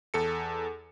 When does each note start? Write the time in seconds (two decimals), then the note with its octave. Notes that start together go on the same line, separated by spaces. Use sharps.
0.14 E2 A4 C#7